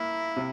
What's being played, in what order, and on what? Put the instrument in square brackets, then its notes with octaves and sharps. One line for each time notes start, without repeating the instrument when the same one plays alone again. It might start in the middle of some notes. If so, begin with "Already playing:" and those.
Already playing: [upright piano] A#3 [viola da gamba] E4
[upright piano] C3